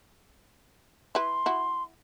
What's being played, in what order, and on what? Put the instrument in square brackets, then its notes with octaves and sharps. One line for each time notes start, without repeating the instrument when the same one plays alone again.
[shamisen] E4 B4 [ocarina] C6
[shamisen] E4 F#4